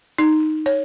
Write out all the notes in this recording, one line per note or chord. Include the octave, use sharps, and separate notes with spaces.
D#4
C#5